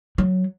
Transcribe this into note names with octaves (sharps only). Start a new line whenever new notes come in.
F#3